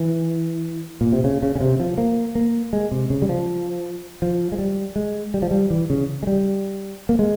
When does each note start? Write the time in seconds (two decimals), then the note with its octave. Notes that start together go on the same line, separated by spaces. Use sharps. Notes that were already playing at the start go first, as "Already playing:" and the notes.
Already playing: E3
1.01 A#2
1.13 C3
1.24 C#3
1.43 C#3
1.56 C#3
1.60 C3
1.80 F3
1.98 A#3
2.35 A#3
2.73 G#3
2.92 C3
3.10 C#3
3.22 G3
3.29 F3
4.22 F3
4.52 G#3
4.59 G3
4.96 G#3
5.34 G3
5.42 F3
5.51 G3
5.70 E3
5.90 C#3
6.23 G#3
6.27 G3
7.09 A#3
7.19 G#3